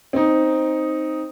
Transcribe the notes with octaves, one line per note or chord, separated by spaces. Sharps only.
C4 D#4